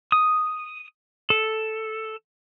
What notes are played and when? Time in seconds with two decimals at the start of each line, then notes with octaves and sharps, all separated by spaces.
0.12 D#6
1.30 A4